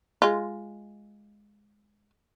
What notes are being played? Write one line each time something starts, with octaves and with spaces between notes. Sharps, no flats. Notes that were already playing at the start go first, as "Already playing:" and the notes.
G#3 F4